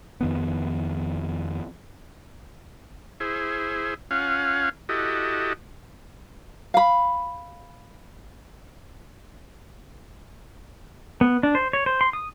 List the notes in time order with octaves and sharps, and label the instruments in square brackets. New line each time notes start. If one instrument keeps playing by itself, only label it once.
[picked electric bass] F2 D#3 B3
[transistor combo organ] E4 G#4 C5
C#4 F4 F5 F#5 G#5
E4 F#4 G4 A4 D#5
[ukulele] F5 B5
[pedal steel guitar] B3
D4
C5
C#5
C5
C6
D#6